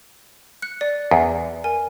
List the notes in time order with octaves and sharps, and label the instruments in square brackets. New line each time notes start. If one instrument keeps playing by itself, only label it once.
[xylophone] F#6 C#7
D5
[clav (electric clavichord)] E2
[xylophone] A#4 G#5